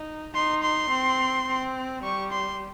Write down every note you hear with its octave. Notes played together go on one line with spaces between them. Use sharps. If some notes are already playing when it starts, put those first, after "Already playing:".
Already playing: D#4
D#4 C6
C6
C4
C4
G3 C#6
C6